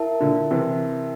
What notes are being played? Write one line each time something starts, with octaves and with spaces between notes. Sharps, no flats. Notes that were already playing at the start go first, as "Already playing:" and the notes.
Already playing: E4 A#4 E5 A5
A#2 D3
C3 E3